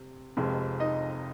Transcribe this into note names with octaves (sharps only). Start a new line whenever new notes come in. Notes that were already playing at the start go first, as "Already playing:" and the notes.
Already playing: C3
F1 F2 C3 F3 G#3
D#4 D#5